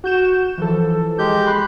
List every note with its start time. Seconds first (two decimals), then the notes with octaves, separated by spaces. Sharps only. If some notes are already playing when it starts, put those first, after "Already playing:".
0.04 F#4 G6 E7
0.58 E3 F3 A4
1.19 G#3 G4 G6
1.46 B5 C6 F#6